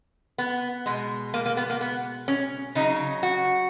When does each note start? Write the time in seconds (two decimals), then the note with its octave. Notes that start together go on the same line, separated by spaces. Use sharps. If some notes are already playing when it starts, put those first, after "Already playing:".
0.38 B3
0.86 B2 G#3
1.34 A#3
1.46 A#3
1.57 B3
1.70 A#3
1.81 B3
2.28 C#4
2.75 C#3 F#3 D#4
3.23 F#4